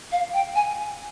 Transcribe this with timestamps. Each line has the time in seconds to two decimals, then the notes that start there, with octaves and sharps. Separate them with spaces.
0.12 F5
0.33 G5
0.55 G#5